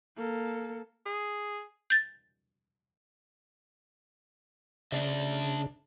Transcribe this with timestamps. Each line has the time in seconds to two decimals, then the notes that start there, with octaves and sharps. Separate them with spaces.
0.17 A#3 A4
1.06 G#4
1.90 G6 A6
4.92 C#3 D4 D5 E5